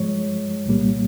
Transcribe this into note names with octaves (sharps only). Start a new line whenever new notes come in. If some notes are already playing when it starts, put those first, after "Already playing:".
Already playing: G2 F3 G#3 C#5
C2 A#2 G3 A#3